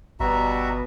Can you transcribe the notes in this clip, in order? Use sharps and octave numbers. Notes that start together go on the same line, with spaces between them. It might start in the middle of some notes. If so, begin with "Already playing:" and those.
G1 B2 G3 F#4 E5 A#5